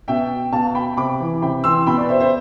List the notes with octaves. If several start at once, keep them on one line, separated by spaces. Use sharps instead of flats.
B2 E5 G5
B2 F5 A5
G5 B5
C3 B5 D6
E3
C3 G5 B5
E3 C6 E6
B2 G5 B5
B4 D5
C5 E5
C5 E5